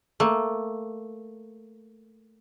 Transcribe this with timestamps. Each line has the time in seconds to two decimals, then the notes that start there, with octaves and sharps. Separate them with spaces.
0.20 A3 A#3